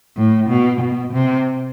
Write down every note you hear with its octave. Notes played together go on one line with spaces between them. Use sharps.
A2
B2
B2
C3